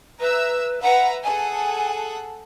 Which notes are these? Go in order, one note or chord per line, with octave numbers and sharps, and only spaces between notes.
B4 E5 A#5 E6
B4 E5 F#5 A#5
G#4 A4 F#5 G#5